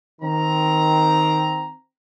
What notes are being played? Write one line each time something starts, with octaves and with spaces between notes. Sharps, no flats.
D#3 C4 A#5